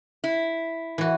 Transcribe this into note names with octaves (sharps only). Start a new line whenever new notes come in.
E4
E3 F#4